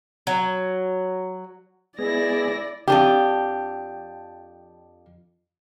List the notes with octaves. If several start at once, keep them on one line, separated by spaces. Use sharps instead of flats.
F#3
G#3 B3 E4 G#4 D5 A#6
F2 D4 G4